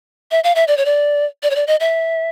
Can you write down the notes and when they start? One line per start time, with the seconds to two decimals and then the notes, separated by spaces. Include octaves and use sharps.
0.31 E5
0.44 F5
0.56 E5
0.68 D5
0.77 C#5
0.85 D5
1.43 D5
1.50 C#5
1.56 D5
1.67 D#5
1.80 E5